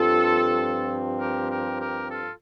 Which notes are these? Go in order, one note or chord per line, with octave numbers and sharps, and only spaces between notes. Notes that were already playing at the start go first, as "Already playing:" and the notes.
Already playing: G2 F3 C4 F4 A4
G4 A#4
G4 A#4
G4 A#4
F4 A4